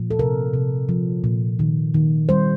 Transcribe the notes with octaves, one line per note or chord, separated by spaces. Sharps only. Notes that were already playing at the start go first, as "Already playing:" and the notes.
Already playing: A#2 F3
A4
C3 A#4
C3
F3
A#2
D#3
D#3
G3 C5